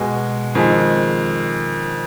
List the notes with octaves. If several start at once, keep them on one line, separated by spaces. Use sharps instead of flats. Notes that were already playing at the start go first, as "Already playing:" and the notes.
Already playing: B2 G#3
F2 D#3 G#3